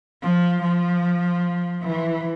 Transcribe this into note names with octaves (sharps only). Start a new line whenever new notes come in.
F3
F3
E3